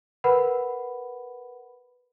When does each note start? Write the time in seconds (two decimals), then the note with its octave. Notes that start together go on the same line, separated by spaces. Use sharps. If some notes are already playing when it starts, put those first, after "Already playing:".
0.24 A#4 B4 F#5 B5